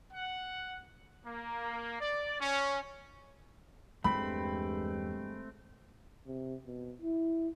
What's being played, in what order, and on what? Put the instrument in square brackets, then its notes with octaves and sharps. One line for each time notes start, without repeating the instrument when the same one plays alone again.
[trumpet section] F#5
A#3
D5
C#4
[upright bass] E2 [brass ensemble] G2 G#3 [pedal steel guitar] A3 C4 [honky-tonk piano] B5
[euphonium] C3
B2
E4